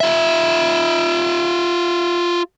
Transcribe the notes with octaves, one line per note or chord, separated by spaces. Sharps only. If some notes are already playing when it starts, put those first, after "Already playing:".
F4 E5